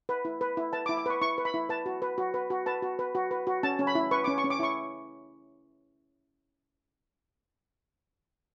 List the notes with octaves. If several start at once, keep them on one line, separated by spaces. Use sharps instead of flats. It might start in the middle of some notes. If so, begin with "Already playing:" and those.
B4
E4
B4
E4
B4 A5
D6
E4
D6
B4 C#6
E4 C#6
B4
B5
E4
B4 A5
F#4
B4
F#4
B4
F#4
B4 A5
F#4
B4
F#4
B4
F#4
C#4 A5
C#4
B5
E4
B4 C#6
C#4 D6
C#6
C#4
D6
E4 C#6